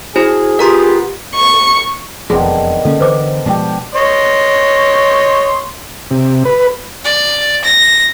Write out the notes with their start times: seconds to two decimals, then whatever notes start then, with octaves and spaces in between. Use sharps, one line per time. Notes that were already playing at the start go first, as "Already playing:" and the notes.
0.16 E4 F#4 G#4 C5
0.59 B3 F4 G4 A#4 A#5 C6
1.35 C#6
2.30 E1 F2 D#3 F#3 B3 D4 G#4 C6
2.85 D3 A#3 C#4 A4
3.01 D3 E3 B4 C5 D6
3.46 B2 F3 G#3 D4 G4
3.95 C#5 D#5 C6
6.11 C3
6.45 B4
7.05 D5
7.64 A#6